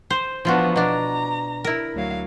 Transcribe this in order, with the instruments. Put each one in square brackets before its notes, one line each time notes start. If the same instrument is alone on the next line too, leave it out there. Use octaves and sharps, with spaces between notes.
[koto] C5
[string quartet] E3 B3 D4 [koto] F3 F4 F#4
[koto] B2 D4 [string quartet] A#5
[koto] E4 A#4
[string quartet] D2 F#3 F5